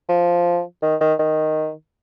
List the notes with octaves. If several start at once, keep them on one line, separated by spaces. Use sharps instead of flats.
F3
D#3
D#3
D#3